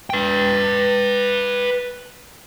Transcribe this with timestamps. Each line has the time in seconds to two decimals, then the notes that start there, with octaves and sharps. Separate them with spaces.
0.10 B4 G5